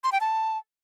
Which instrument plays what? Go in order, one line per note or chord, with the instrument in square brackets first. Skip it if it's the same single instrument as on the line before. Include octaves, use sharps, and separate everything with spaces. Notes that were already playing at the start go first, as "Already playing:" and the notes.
[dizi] C6
G5
A5